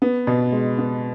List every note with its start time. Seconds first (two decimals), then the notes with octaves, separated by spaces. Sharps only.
0.02 B3
0.27 B2
0.52 G#3
0.78 B3